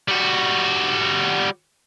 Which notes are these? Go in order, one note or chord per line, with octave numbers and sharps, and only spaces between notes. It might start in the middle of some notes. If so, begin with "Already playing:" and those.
G3 F#4